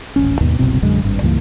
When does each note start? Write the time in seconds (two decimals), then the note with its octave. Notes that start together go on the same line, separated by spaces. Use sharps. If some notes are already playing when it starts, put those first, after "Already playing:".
0.16 D#1 A1 C#4
0.41 D#2 G#2 B2 D#3
0.59 F#1 C2 B2 C4
0.82 A#1 F#2 D3 G#3
1.03 G#1 G2
1.22 C#2 G2 E3 A#3